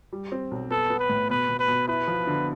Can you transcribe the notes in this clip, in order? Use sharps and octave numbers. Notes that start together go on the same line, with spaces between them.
G3
C4
B1
B3 A4
B3
B4
A2
B2 B4
B2
B4
B2
E4 B4
F3
D3